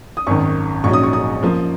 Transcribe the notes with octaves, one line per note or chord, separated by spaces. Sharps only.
D#6
G#1 F#2 D#3 C#6
A#1 G#2 F#3 C#4 C#6
D#6
C#6
D#6
F#2 F3 A#3